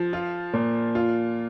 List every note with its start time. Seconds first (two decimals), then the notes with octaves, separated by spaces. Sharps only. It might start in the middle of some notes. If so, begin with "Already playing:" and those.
Already playing: F3
0.13 F4
0.53 A#2
0.95 F4